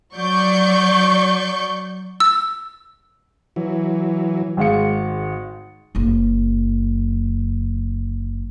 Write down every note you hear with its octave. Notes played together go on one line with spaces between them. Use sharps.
F#3 D5 C#6 G6
E6
E3 F#3
G#1 G#3 F5 C#7
F#1 F#2